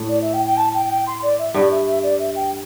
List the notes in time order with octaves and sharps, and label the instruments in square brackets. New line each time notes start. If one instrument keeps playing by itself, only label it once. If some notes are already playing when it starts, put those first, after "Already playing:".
Already playing: [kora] A2
[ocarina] D5
E5
G5
G5
A5
G5
G5
C6
D5
E5
[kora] G2 [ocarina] D5
[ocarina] E5
E5
D5
E5
G5